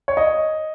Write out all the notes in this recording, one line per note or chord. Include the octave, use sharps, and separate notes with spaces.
C#5
D#5